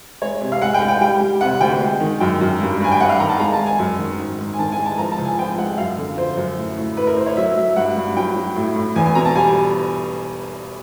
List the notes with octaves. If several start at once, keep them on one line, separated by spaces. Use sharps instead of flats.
G#3 C#5
C3
F5
G#3 F#5
G5
G#3
G5
G3 G5
G3
C3 F#5
D2 G5
G#3
D#3
F#2 G5
F#2
G2
G2 G#5
G5
G2 F#5
F5
D#3 A#5
A5
G#3 A#5
A5
G#3
G#5
F#2
D#3
G#2
G#2
G#5
D#3 A5
G#5
G#3
A5
F3 A#5
A5
C#2
G#5
F3 G5
G#3 F#5
F#2 F5
D3
F3 C5
F#2
A2
A2
A2 B4
A#4
A2 C5
C#5
F#3 E5
F#3 E5
G2 F#5
G2
F#3 G5
F#3
A2
A2
E2 G#5
G#5
B2 A#5
A5
G3 G#5